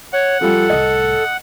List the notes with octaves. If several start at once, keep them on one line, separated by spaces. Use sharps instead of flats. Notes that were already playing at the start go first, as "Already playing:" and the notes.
C#5 F#5
F3 G3 A4
C2 A2 D#5